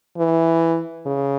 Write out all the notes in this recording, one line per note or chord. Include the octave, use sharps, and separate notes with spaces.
E3
C#3